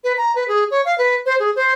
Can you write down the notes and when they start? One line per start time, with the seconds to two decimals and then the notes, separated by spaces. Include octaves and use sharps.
0.04 B4
0.17 A#5
0.35 B4
0.48 G#4
0.71 C#5
0.85 F5
0.98 B4
1.26 C5
1.40 G#4
1.56 C5